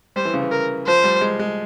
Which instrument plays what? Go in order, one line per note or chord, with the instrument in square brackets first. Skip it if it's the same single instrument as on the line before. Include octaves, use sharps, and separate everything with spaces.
[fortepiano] G3 [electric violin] C5
[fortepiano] E3
C#3
E3
[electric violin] A#4
[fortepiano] F3 [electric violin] C5
[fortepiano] G3
G#3
G#3